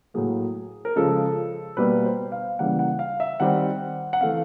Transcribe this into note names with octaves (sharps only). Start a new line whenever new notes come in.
A2 F#3 A#3 G#4
A#4
C#3 F3 G#3 A4
B2 G3 A#3 B4
C5
F5
C#3 E3 G3 A#3 F#5
F#5
F5
E5
D#3 G3 C4 F#5
F#5
E3 A3 C4 F5